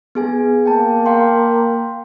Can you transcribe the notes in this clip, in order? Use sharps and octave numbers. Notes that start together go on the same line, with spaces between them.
B3 G#4 G#5
A#3 G5 A5
F5 G5 C6